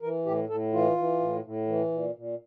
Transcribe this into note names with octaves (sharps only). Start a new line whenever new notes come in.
E3 A#4
A2 G4
A2 A4
E3 F4
E3
A2
A2
E3
A#2
A#2